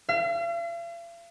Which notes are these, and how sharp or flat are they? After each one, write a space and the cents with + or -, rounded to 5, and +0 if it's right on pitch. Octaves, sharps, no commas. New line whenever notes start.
F5 -45